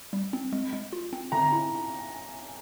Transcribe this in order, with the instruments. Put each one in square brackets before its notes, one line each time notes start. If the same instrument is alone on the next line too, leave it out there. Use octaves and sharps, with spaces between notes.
[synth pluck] G3
C4
G#3
G#3
F4
C4
[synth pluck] D3 [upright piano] A#5
[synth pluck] E4